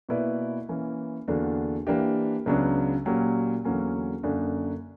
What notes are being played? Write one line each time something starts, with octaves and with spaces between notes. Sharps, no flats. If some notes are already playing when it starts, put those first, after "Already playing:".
B2 A#3 E4 B4 D5
E3 A#3 C#4
E2 D3 A#3 D4 F#4
E3 A#3 D4 G4
C#2 C#3 F#3 B3 D4
A#2 F#3 A#3 C#4 G4
E2 D3 F#3 A#3 C#4
F#2 D3 A#3 D4